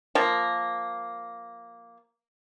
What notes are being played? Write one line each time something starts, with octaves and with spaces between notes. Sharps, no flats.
F3 A#3